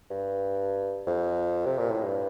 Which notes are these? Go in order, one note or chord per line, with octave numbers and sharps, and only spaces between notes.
G2
F2
C3
A#2
A2
G2